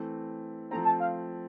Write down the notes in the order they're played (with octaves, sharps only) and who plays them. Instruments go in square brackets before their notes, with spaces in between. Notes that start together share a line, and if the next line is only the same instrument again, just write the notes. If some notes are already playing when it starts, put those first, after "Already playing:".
Already playing: [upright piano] E3 A3 C4
[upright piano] F3 A3 C4 [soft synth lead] A#5
[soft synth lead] A5
F5